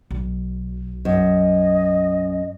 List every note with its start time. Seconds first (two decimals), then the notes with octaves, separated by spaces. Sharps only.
0.11 B1
1.05 F#2 D#5